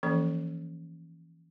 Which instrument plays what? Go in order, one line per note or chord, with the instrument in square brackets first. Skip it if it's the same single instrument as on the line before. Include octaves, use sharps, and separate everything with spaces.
[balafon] E3 F3 A#3 C#4 A4